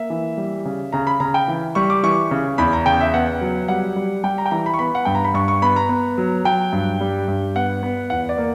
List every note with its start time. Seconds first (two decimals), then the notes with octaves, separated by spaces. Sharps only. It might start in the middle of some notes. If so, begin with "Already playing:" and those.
Already playing: A#3 E5
0.10 E3
0.38 G3
0.65 C#3
0.92 C#3 A#5
1.07 B5
1.20 C#3 A#5
1.34 G5
1.48 E3
1.75 G3 C#6
1.90 D6
2.03 E3 C#6
2.31 C#3
2.58 E2 B5
2.73 A#5
2.86 C#3 G5
3.00 E5
3.14 B3 F#5
3.41 F#3
3.68 G3 F#5
3.96 G3
4.24 G3 G5
4.38 A#5
4.46 G5
4.51 E3 A#5
4.66 B5
4.74 C#6
4.79 B3 B5
4.95 F#5
5.05 G2 G5
5.15 A#5
5.24 B5
5.34 G2 C#6
5.48 C#6
5.62 B3 B5
5.76 A#5
5.89 B3
6.18 F#3
6.44 F#3 G5
6.73 G2
7.01 G3
7.28 G2
7.55 B3 F#5
7.83 B3
8.10 E2 F#5
8.29 D5
8.38 A#3